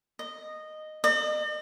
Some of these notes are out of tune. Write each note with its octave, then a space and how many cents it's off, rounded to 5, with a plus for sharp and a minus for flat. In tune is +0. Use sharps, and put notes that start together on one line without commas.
D#5 -10
D#5 -45